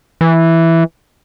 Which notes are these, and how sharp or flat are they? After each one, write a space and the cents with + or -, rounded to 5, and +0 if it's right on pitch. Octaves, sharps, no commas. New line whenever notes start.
E3 +0